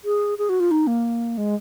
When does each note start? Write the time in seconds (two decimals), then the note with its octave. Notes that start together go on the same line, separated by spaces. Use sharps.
0.05 G#4
0.38 G#4
0.49 F#4
0.60 F4
0.71 D#4
0.87 A#3
1.38 G#3